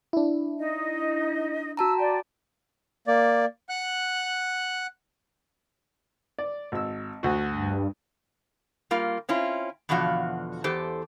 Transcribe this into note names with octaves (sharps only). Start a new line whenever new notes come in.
D4 E4
D#4 D#5
F#4 A5 A#5 E6
D5 G5
A#3 D5
F#5 F#6
D5
G#1 E6
D2 F#4
G2
G3 A#3 F4
C4 C#4 E4 F4
E2 B2 D3 F3 F#4 F5
E2 G4 A4 C5